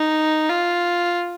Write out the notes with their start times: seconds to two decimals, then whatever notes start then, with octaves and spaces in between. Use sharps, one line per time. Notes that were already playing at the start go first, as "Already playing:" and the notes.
Already playing: D#4
0.49 F4